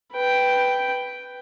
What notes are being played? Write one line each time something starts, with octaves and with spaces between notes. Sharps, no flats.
B4 G5